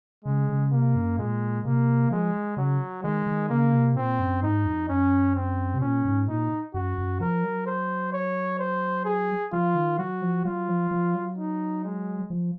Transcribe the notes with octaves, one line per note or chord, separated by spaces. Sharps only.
C#3 G#3
C#3
C3 A#3
F#2
A#2 G#3
C3 A#3
F3 G#3
C#3 F#3
D#3 G#3
D#3
C#3 A#3
C3
A#2 C4
F#2
G#2 D#4
F2
F#2 C#4
C4
C3
A#2 C#4
G#2
A#2 D#4
F#2 F#4
F#2
F3 A#4
F#3
C5
C#5
C5
G#4
F3 F4
D#3
F#3 F#4
F3
F#3 F4
F3
F3
F#3
D#4
G#3
F3